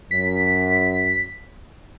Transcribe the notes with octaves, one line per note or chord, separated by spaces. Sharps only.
F#2 B6